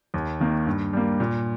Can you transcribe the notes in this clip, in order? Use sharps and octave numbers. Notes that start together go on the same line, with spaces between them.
D#2
D#3 A#3
G2
G3 A#3
A#2